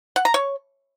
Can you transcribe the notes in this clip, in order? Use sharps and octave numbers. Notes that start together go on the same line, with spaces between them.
F#5
A#5
C#5